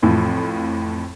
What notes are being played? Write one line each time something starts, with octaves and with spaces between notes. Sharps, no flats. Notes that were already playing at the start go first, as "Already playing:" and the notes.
F2 A2 E3 F3